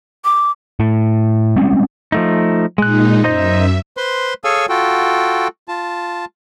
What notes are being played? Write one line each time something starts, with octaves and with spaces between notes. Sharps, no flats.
D6
A2
G3 G#3 C4 C#4
F3 A3 D#4
A#2 G#3 D#4 F#6
F#2 D#4 C5 D#5 E5
B4 C5 C6
G#4 A4 C#5 F5 G#5 E6
F4 F#4 A4 G5
F4 A5